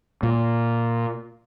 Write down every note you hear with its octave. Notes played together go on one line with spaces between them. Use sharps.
A#2